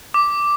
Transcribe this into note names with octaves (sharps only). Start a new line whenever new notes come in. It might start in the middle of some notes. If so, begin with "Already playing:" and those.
D6